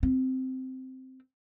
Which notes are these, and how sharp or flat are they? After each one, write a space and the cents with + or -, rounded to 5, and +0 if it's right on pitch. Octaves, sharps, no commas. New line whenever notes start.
C4 -10